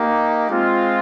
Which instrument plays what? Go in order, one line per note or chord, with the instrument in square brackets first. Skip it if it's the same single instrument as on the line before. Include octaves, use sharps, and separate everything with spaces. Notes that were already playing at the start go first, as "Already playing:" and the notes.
Already playing: [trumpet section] A#3 D#4 G4
G#3 C4 F4